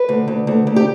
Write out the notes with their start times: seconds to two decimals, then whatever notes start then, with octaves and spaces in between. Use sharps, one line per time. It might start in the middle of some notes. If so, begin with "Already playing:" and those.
Already playing: B4
0.09 D2
0.28 D2
0.47 D2
0.67 D2
0.76 G4